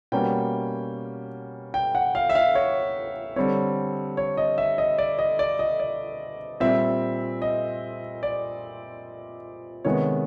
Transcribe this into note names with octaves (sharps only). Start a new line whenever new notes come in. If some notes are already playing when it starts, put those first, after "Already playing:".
B2 G3 A#3 C#4 G5
G5
F#5
F5
E5
F5
C#5
D3 G3 C4 C#5
C#5
D#5
E5
D#5
D5
D#5
D5
D#5
D5
A#2 G3 C4 E5
D#5
D5
C3 D#3 G#3 B3 C#5